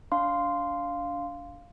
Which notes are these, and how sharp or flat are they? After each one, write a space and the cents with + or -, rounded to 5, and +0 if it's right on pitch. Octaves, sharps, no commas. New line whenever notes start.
D4 -25 F5 +0 C6 -10